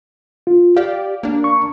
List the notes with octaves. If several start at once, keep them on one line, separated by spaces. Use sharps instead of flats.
F4
G4 D5 F5
A#3 D4
C#6